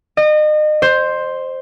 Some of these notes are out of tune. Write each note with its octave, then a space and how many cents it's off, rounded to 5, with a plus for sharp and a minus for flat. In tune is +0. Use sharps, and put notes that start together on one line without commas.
D#5 -35
C5 +5